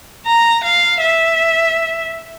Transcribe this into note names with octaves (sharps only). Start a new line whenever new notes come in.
A#5
F5
E5